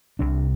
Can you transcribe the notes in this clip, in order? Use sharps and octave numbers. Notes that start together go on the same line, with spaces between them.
C2 C3 D4